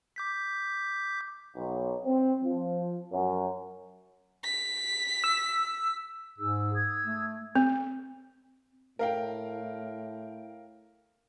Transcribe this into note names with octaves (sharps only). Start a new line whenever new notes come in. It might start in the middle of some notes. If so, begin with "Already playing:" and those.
D6 G6 B6
B1
C4
F3
F#2
B6
E6
G#2 D#4 G#4 E6
D#6 E6 G#6
A3
C4
A2 A#4 F5 G5